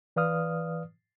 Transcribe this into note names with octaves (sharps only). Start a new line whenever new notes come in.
E3 B4 D5 F5 D#6 F6